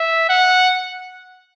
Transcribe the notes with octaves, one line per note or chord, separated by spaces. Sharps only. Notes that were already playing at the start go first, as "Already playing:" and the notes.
Already playing: E5
F#5